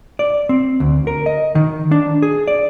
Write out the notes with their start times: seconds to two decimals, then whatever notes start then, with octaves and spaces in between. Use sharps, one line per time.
0.19 D5
0.49 C4
0.80 D2
1.07 A#4
1.26 D#5
1.55 D#3
1.92 D4
2.22 G#4
2.48 D5